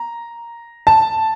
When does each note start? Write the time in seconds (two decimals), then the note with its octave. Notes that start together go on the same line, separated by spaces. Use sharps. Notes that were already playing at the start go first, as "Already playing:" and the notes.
Already playing: A#5
0.87 A5